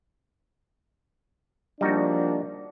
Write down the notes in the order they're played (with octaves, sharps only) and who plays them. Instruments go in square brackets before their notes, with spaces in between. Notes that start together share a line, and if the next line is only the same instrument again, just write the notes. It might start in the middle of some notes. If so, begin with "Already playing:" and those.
[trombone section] F3 A#3 D4 [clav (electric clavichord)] G3 D#4 F#4